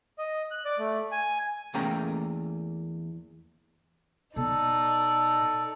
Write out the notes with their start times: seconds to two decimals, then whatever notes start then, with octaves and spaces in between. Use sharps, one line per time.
0.18 D#5
0.51 F#6
0.65 D5
0.78 A3
1.12 G#5
1.74 E2 A3 A#3 C#4 G5 A#5
4.36 B2 D#4 A4 D5